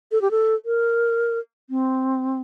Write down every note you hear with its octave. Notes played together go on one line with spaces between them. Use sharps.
A4
G4
A4
A#4
C4